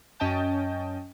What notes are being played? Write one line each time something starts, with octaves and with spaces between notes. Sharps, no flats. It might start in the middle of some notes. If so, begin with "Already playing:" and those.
F#2 C#4 D#5 G5 A5 G6